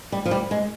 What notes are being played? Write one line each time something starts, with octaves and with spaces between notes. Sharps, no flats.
G3
F3
G3
G#3